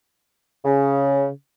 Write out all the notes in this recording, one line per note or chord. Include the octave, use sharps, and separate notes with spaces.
C#3